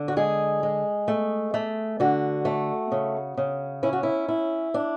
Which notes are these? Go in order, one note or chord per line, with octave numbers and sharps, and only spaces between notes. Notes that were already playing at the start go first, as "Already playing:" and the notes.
Already playing: D3
F#4
G#3 G#4
G#3
A3
A3
D3 F#4
A3
C#3
C#3
C#4 E4
F#4
E4
E4
D4